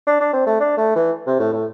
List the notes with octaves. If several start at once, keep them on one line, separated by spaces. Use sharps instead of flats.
D4
D4
C4
A3
D4
A3
E3
C3
A2
A2